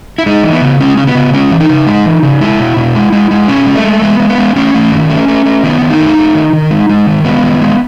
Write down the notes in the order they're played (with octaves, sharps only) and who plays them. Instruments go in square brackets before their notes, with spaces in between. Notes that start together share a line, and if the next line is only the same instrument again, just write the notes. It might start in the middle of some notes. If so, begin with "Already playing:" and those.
[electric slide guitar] E4
G#3 D#4
E3
B3
C#3
G#3 C#4
C#3 C#4
B3
C#3
G#3 C#4
E3
D#4
C#3
G#3
E3
C#3
G#3 E4
B2
B2
G#3
G#3
G#3
B2 C#4
G#3
A3
G#3
G#3 B3
G#3
B3
G#3
A3 C#4
A3
D#3
A3
A3
A3
D#3 B3
D#3
D#4
A3
A3
D#3
D#3
G#3
G#3
D#3
G#3 B3
D#3
G#3